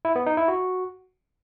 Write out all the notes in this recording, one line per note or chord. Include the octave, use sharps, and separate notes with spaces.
E4
B3
D#4
E4
F#4